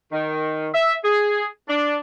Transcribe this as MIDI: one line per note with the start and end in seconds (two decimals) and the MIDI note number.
0.12 0.68 51
0.74 0.95 76
1.04 1.46 68
1.68 1.96 62